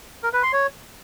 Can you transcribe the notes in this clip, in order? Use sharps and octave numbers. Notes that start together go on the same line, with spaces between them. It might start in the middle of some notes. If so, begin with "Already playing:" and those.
A#4
B4
C6
C#5